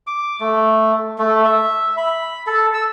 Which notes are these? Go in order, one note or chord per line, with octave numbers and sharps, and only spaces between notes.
D6
A3
A3
E5
B5
A4
E6